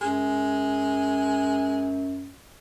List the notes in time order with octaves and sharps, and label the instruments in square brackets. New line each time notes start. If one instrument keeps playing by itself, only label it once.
[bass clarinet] F#2 [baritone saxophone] G#3